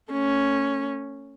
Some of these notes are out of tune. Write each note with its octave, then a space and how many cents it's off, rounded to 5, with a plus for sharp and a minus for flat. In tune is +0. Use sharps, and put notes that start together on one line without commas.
A3 +40 C#4 +0